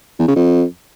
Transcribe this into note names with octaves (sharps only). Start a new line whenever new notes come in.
E2
C#3
F2